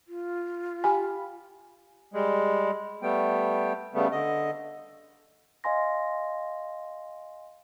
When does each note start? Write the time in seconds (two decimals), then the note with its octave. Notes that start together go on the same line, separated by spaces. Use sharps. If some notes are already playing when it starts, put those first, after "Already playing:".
0.08 F4
0.84 G4 F5 G#5 B5
2.14 G3 G#3
3.03 G3 A3 B3 G5
3.94 C#3 G3 A3 B3
4.12 D3 D#5
5.64 D#5 F5 G#5 C6 A#6